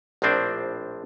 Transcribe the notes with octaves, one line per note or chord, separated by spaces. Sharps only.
A#1 A2 F3 C4 D4 C5